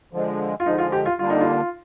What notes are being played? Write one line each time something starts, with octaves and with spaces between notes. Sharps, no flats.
D3 F3 G#3
F4
D3 F3 G#3 D#4
F4
G4
F4
D3 G3 A#3 D4 F4
D#4
F4